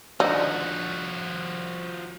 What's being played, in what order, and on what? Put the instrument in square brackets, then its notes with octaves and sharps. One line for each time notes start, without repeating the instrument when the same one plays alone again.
[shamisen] D3 D#4 [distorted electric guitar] F3 F#4